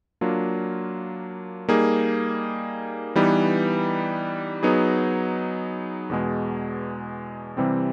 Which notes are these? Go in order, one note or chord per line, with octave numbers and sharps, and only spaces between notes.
F#3 A#3 D4 F4
G3 A#3 D#4 G#4
E3 G3 B3 D#4
F#3 B3 D#4 G#4
E2 B2 G#3
C3 E3 G3 C4